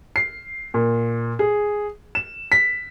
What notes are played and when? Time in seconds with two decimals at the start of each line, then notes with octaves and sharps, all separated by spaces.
0.16 C7
0.74 A#2
1.39 G#4
2.15 E7
2.52 B6